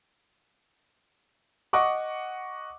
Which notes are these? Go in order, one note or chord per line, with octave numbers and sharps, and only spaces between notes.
D#5 F#5 C#6 D6